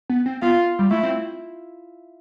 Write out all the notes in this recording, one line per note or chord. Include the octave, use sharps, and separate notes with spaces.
B3
C4
B3 F4
G3
A3 E4
C4